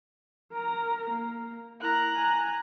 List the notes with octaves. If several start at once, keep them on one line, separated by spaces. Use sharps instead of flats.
A#4 A#5
A#3
E4 A#4 A#5 F#6
G#5